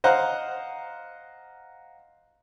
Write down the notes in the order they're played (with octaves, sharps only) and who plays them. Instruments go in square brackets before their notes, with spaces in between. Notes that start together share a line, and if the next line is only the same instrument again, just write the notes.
[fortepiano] C5 D#5 F5 F#5 A#5